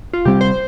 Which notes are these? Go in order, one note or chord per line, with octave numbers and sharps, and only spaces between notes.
F4
C3 G3 C4 G4
C5